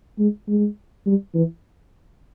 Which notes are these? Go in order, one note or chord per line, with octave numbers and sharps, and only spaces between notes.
G#3
G#3
G3
E3